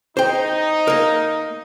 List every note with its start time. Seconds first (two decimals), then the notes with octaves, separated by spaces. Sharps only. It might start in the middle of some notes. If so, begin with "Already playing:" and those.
0.17 D#4 C5 G5
0.87 A#3 A#4